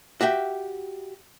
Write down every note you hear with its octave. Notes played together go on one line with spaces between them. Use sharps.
F#4 G4 E5 G5